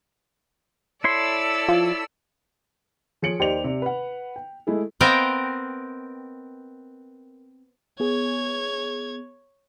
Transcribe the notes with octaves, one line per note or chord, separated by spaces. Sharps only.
E4 A4 C#5 D5 C6 E6
F3
F3 G#4 C#5 C#7 D7 F#7
D#2 G4 C5 D5 D#5 F7
C3 D5
B4 F#5
G5
G#3 A3 E4 G#4
B3 C4 A#4 D#5 F5 G5
B3 G#4 C#5 G#6